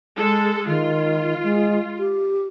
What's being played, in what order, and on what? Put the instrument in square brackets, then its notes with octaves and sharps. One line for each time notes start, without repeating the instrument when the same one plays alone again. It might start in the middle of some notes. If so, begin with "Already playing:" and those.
[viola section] G#3 A4
[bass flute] D#3 [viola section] F4
[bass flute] G#3
G4